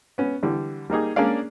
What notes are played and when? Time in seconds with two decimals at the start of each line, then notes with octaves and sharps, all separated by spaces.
0.18 B3 C#4
0.43 D3 E3 G3
0.90 G3 A#3 D#4 G#4
1.16 A#3 C#4 D4 G#4 D5 F5